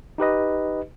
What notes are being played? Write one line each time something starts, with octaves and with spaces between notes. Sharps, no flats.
D#4 G4 B4 D#5